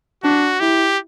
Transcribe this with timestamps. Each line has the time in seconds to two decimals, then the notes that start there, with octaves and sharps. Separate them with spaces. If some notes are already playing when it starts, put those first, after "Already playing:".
0.23 D4 F#4
0.60 E4 G4